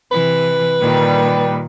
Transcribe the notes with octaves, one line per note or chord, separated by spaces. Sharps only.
C3 E3 B4
A#2 D#3 G3